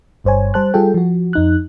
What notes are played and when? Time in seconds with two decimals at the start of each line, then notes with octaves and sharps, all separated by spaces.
0.24 G1 G2 C5 C#5 G#5
0.54 G3 C5 A5 F#6
0.74 G3 F4 G#4 A4 G5
0.94 F3 F#4
1.33 F2 D#4 F#6